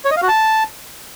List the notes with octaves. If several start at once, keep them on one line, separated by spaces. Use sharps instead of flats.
C#5
D#5
F5
F#4
A5